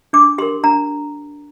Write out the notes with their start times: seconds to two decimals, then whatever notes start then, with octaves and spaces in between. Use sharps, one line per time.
0.13 D4 D6
0.38 G4 A#4 C6
0.64 D4 A#5